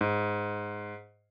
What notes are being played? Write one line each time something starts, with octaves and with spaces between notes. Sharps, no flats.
G#2